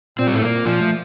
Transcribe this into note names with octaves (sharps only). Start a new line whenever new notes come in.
A#2 C4
G3
A2 A3
A#2 A#3
A#2 F3
A3